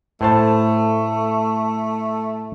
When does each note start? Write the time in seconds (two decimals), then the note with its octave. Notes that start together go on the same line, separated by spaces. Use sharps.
0.21 A2 A3 C5 A5